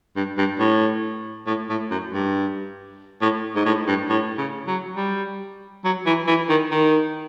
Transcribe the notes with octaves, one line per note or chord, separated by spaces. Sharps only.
G2
G2
A2
A2
A2
F#2
G2
A2
G#2
A2
G2
A2
C#3
F#3
G3
F#3
E3
E3
D#3
D#3